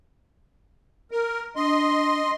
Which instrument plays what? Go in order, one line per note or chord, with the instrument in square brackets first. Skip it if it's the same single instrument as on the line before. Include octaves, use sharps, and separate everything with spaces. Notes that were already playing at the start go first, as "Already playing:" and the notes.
[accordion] A#4
[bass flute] D4 [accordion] D#5 C6